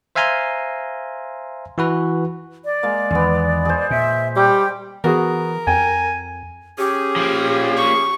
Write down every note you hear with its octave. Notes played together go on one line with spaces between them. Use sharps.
C5 E5 F5 G#5 A#5 C6
E3 F#4 B4
D5
G#3 A#3
E2 D#3 G#3 B3
G#4 C5
A#2 E5
G3 G5
E3 B3 F#4 G#4 A#4
F2 G5 G#5
C#4 G4 G#4
F3 A#3
C#6